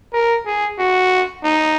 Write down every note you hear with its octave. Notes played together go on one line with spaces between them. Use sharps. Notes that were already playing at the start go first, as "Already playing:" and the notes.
A#4
G#4
F#4
D#4